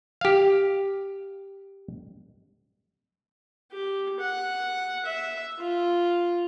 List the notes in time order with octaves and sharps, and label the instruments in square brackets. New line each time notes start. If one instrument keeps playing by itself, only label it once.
[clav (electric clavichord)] G4 F5
[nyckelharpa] G4
F#5
E5
F4